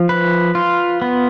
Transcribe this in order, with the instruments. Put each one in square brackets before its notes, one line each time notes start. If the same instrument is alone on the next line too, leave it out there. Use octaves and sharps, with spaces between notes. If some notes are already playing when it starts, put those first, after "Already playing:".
Already playing: [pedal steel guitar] F3
B4
F4
B3